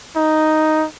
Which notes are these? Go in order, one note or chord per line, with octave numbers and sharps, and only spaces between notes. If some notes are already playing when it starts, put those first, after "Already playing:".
D#4